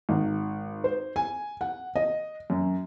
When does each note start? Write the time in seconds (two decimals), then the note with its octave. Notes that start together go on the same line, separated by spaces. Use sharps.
0.09 G#1
0.84 C5
1.16 G#5
1.61 F#5
1.95 D#5
2.50 F#2